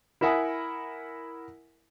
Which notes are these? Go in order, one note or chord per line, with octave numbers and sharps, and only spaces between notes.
E4 A#4 E5 F#5 G#5 D#6